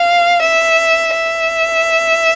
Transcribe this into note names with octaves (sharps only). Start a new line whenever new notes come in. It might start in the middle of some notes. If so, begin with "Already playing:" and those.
Already playing: F5
E5
E5